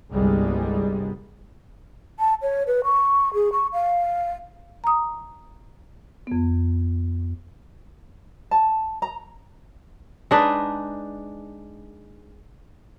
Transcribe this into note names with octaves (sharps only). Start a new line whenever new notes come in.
G1 C2 G3 G#3
A5
C#5
B4
C#6
G#4
C#6
F5
A#5 D#6
F2 B3
A5
A#5
G#3 D4 D#4 B4